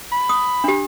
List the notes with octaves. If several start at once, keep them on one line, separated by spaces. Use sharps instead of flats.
B5
D#6
D4 G4